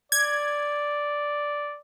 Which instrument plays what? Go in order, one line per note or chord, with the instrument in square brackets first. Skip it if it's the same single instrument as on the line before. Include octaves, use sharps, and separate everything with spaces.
[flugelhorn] D5 [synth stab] G#6